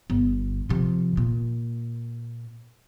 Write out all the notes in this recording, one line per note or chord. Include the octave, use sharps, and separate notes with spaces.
G1
C3 F3
A#2